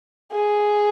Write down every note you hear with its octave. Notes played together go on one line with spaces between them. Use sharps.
G#4